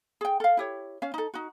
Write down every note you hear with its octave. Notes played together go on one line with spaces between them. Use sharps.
G#4 G5
A4 F5
E4 G4 C#5
C#4 F5
D#4 A4
D#4 F#4